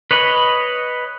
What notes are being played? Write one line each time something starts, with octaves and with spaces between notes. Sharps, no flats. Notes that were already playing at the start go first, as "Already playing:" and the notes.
B4 C#5 D#5 B5